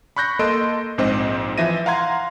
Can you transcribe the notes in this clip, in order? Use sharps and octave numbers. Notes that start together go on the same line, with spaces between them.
B5 C#6 F#6 G6 A#6
A#3 A4 D#5 C6 D7
A#1 G#2 C4 C5 D#5
E3 F3 E5 A#6 D#7
F5 F#5 A#5 C6 G#6